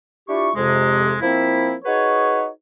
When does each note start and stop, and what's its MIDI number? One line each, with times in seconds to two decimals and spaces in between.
0.29 0.50 62
0.29 0.50 64
0.29 0.50 65
0.29 0.50 67
0.29 0.50 85
0.55 1.16 41
0.55 1.16 48
0.55 1.16 56
1.21 1.74 53
1.21 1.74 58
1.21 1.74 60
1.21 1.74 64
1.85 2.48 63
1.85 2.48 66
1.85 2.48 68
1.85 2.48 71
1.85 2.48 73